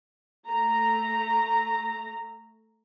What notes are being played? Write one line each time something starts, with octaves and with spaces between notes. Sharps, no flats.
A3 A#5